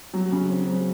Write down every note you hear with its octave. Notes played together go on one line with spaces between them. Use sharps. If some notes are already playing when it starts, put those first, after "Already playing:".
F#3
C#3
C4
F#3